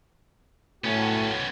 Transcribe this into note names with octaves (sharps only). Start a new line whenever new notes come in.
A2 B3 C#4 F#4